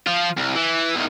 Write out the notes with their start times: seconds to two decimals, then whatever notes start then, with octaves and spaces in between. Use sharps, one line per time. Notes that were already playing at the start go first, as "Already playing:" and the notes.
0.07 F3 F4
0.37 C2
0.55 E3
0.95 E2 D#3